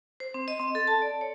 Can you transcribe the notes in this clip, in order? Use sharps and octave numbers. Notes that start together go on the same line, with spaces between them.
C5
C4
D#5
C4
A4
A5
D5
C#5